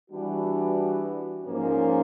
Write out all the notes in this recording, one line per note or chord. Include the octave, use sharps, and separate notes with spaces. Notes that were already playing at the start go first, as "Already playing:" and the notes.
E3 G3 B3 D4 F#4
G#2 F3 A#3 C#4